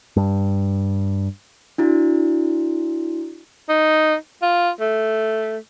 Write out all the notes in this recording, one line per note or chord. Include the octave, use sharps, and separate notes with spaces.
G2
D4 E4 F#4
D#4
F4
A3